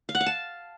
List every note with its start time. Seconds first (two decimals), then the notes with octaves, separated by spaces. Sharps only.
0.09 F5
0.15 F#5
0.21 F5
0.26 A5